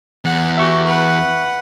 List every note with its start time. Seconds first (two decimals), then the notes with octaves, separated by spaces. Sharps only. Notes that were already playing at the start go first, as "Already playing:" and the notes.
0.25 E2 F#5
0.57 F#4 G4 E5 C#6
0.86 B4 F#5